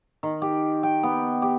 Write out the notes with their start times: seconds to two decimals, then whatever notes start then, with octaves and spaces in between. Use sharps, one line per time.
0.23 D#3
0.42 G4
0.83 G5
1.03 B3
1.42 G4